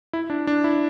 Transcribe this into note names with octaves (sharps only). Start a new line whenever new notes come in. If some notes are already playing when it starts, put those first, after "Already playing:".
E4
D4
D4
E4